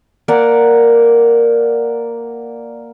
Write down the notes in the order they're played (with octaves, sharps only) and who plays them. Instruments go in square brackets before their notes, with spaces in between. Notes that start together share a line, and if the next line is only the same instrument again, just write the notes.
[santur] A#3 A#4 D5 F#5